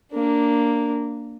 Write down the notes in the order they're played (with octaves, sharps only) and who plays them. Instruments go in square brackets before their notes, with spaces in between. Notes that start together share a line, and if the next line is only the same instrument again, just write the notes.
[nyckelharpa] A#3 D4